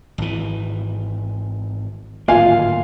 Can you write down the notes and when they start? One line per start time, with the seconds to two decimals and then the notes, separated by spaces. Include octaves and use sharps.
0.18 G#1 E3
2.28 D1 G#1 A#3 F4 F5 G#5